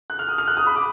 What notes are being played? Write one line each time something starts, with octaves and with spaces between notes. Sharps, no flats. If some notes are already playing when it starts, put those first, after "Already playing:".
F#6
F6
D#6
F6
F#6
D#6
B5
D6